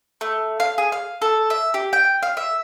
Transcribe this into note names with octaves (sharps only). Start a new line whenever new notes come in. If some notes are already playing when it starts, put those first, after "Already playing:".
A3
F5
G#4
F5
A4
E5
G4
G5
F5
E5